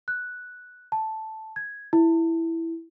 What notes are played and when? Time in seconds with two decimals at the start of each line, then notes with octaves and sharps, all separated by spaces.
0.08 F#6
0.92 A5
1.56 G#6
1.93 E4